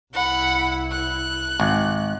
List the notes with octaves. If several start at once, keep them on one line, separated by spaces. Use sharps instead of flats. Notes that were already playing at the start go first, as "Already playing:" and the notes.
C2 E4 F#5 B5
F#6
G#1